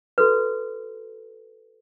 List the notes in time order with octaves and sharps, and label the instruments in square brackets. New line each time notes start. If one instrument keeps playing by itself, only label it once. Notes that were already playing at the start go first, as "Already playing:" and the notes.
[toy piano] F#4 A4 B4